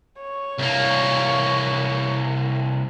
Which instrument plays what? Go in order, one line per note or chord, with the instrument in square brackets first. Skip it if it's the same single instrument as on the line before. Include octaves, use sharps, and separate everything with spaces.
[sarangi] C#5
[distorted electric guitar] C2 A#3